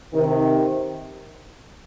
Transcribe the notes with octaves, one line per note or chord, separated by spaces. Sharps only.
C3 D#3